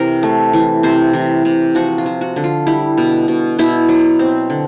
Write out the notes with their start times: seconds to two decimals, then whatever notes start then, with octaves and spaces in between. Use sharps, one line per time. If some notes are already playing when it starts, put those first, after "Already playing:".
Already playing: C3 E3 A#4
0.23 A3
0.53 E3
0.83 C3 C5
1.13 E3
1.45 C3
1.75 F3 F#4
1.98 F4
2.06 F3
2.21 F#4
2.36 D3
2.44 F4
2.67 G3 E4
2.98 B2
3.28 B2
3.59 B2 E4
3.89 F#3
4.19 C4
4.50 D3